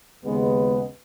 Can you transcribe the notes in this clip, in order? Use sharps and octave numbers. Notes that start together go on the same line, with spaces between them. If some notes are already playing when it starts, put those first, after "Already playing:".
D#2 C#3 G#3 B3